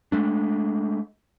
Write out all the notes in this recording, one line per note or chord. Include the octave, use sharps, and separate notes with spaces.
G#3 A3 D4